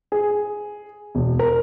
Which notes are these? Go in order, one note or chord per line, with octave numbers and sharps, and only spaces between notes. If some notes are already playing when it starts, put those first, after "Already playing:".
G#4
E1
A#4